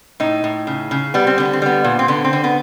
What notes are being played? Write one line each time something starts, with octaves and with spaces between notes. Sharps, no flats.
A2 D#4
A2
C#3
C#3
G3 B3
C4
D3 B3
C4
G3 B3
A#2
C4
D3 B3
C4
D3
B3